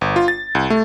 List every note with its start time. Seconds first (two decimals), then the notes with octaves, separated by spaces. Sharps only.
0.01 G1
0.16 F4
0.28 A6
0.55 C2
0.70 A3